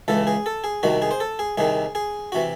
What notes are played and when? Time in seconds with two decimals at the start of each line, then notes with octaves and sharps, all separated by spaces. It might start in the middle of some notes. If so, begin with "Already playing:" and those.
0.08 C#2 C#3 E3 A4
0.27 G#4
0.46 A4
0.64 G#4
0.83 C2 C3 D#3 F#4
1.02 G#4
1.11 C5
1.20 A4
1.39 G#4
1.58 C2 C3 D#3 G#4
1.95 G#4
2.32 C3 E3 F#4